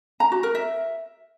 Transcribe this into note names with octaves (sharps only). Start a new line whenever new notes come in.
A#5
F#4
A#4
E5